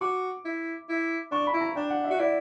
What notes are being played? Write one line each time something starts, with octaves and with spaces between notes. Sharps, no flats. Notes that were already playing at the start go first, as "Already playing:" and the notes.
F#4 D6
E4
E4
D4 C#6
B5
E4
A#5
D4 G5
F#5
E5
F#4
E4 D5